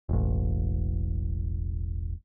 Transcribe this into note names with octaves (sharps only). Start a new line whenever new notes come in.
E1 A1